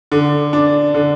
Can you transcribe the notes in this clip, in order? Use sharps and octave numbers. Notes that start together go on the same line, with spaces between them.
D3
D4
D3